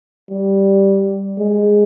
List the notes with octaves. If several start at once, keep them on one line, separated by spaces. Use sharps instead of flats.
G3
G#3